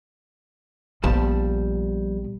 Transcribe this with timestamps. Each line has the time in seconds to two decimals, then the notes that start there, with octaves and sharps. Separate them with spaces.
1.03 A#1 F3 G3 B3 A5